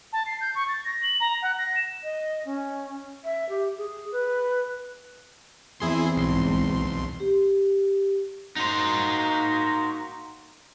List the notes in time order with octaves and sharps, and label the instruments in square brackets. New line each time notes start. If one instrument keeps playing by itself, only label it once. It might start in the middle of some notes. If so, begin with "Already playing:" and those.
[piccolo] A5
C7
G6
C#6
A6
A#6
F#7
A#5
F#5
A#6
E7
[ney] D#5
C#4
E5
G4
G#4
B4
[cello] E2 C4 [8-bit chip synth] E4 G#4 C6
[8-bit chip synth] B1 C6 [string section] G#2
[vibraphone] G4
[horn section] A#3 F#4 A#5 [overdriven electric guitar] D#4 C5